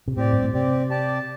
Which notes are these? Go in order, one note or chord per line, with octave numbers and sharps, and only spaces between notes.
C3
A2 C4 G4 D5
G2
A2
C3 C4 G4 D5
G4 D5 A5